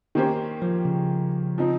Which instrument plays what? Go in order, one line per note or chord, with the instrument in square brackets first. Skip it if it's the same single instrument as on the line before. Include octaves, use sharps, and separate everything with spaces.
[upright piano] D#3 A#3 C#4 G4 C5
[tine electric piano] F3
C#3
[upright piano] F3 C4 D#4